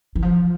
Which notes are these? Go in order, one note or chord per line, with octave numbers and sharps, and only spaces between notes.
E3
F3